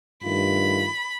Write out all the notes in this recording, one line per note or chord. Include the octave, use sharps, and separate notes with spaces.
G2 D#3 A3 F4 B5